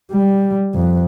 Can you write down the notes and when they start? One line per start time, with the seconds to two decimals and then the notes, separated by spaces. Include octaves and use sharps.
0.12 G3
0.75 F2